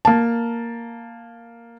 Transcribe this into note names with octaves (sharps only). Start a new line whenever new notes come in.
A#3 A5